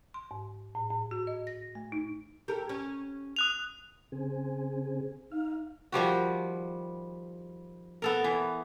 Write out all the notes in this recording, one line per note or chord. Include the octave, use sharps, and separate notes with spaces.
C6
G#2
A2
A2
F#4
D#5
A#6
A3
D#4
G4 A4 A#4
C#4
D#6 F#6 F7
C#3 C4 G#4
D#4 F5
D#3 F3 G3 F#4
B3 A4 A#4
E3